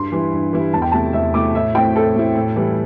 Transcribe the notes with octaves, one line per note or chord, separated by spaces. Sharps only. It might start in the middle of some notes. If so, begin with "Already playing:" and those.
Already playing: G2 C6
E3 G3 E4
G2
E3 G3 E4
E2 A5
G5
C3 A3 E4 A5
E2 E5
C3 A3 E4 D6
A2 E5
A3 C4 E4 G5
A2 A4
A3 C4 E4
A2
E3 G3 E4